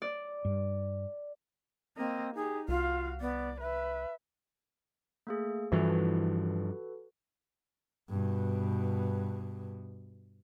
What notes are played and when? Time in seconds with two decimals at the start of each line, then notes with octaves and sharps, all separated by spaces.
0.02 D5
0.45 G2
1.97 A#3 C4 D#5
2.35 D#4 G4 G#4
2.68 C2 F4 F#4 F5
3.21 B3 D5
3.60 B4 E5
5.27 A3 A#3 G#4
5.72 G2 E3 F3 F#4 A4 B4
8.10 G2 B2